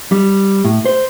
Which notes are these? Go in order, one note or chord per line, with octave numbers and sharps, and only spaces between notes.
G3
A2
C5